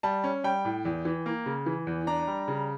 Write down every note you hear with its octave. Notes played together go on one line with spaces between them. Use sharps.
G3 A5
C#4
G3 G5
A2
E2
E3
A#3
C#3
E3
E2
D4 A#5
G3
C#3